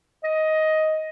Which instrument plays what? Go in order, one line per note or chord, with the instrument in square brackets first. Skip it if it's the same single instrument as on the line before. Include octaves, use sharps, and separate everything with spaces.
[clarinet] D#5